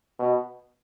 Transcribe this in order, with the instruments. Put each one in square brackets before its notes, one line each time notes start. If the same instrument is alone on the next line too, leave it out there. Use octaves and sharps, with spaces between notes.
[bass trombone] B2